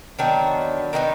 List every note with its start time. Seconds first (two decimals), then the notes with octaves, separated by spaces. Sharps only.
0.19 D#3 F#3 B3 D4
0.93 D#3 F#3 B3 D#4